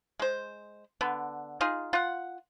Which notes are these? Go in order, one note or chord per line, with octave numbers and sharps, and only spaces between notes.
G#3 C5
D3 B3
D#4 F4 G#4
F4 F#5